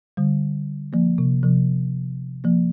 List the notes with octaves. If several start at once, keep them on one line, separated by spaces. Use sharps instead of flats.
D3 G3
F3 A#3
C3
C3 F3
F3 A#3